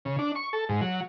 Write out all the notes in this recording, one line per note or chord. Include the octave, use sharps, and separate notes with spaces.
C#3
D4
C#6
A4
G#2
F#3